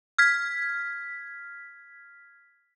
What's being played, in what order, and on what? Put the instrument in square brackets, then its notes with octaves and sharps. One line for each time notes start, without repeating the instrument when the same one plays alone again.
[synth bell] F6 G#6 B6